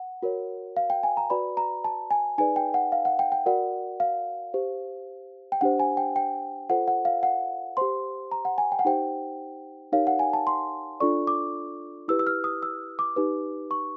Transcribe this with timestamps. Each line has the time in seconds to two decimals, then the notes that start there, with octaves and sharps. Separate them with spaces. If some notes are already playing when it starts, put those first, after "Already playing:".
Already playing: F#5
0.22 F#4 A#4 C#5
0.77 F5
0.90 G5
1.03 G#5
1.17 A#5
1.30 F#4 B4 D5 B5
1.57 A#5
1.84 A5
2.11 G#5
2.38 D#4 G#4 B4 D5 G#5
2.56 G5
2.74 F#5
2.92 F5
3.05 F#5
3.19 G5
3.32 G5
3.46 F#4 A#4 D5 F#5
4.00 F5
4.54 G4 C5
5.52 G5
5.61 D4 G4 C5 F#5
5.80 G#5
5.97 G5
6.16 G5
6.69 F4 A4 C5 F#5
6.88 F#5
7.05 F5
7.23 F#5
7.77 G4 C5 C6
8.32 A#5
8.45 F#5
8.58 G#5
8.72 G5
8.79 F#5
8.85 D#4 G4 C5 G5
9.93 D#4 G4 A#4 C#5 F5
10.07 F#5
10.19 G#5
10.33 A5
10.47 C6
11.00 D4 F4 A4 D5 C#6
11.27 D6
12.08 E4 G4 B4 E6
12.19 E6
12.27 F6
12.44 D#6
12.63 E6
12.99 D6
13.16 D#4 G4 B4
13.71 C#6